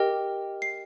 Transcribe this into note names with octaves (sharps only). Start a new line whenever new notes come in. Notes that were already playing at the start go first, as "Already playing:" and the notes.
Already playing: G4 A#4 D#5 G5
C7